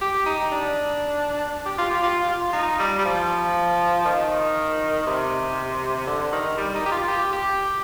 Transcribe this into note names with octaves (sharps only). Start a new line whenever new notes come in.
G4
D#4
D4
G4
F4
G4
F4
F4
D#4
G3
G3
F3
D#3
C3
D3
D#3
G3
D#4
G4
F4
G4
G4